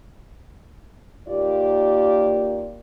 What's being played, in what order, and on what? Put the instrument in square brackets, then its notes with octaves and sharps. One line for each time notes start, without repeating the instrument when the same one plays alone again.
[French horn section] D#2 A#3 F4 G4 D5